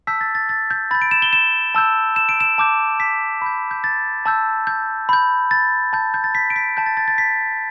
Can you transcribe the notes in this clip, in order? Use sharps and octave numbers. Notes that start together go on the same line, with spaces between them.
A5 E6 G6 B6
A6
A6
A6
G6
B5 G6 A6
D7
E7
G7
E7
A5 E6 G6
E7
D7
E7
A5 D6 G6
B6
B5 G6
G6
A6
A5 E6 G6
G6
B5 G6
A6
A5 G6
G6
A6
B6
D7
B6
A5 G6
A6
A6
A6
B6